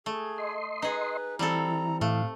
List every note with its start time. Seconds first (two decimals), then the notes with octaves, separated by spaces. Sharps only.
0.06 A3 G#4
0.38 D#5 C6
0.82 D#4 G#4 B4
1.39 E3 G3 C4 A4 A#5
2.01 A2 A3 F5